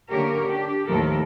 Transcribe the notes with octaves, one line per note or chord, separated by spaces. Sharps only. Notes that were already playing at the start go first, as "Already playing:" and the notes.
D3 A#3 G4 A#4 C#5
D4 G4
D#2 A2 D#3 F3 A4 A#4